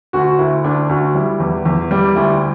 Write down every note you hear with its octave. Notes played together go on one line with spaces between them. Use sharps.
D2 F#4
D2 E4
D2 D4
D2 F#4
G3 E4
E2
E2
G3
D2 E4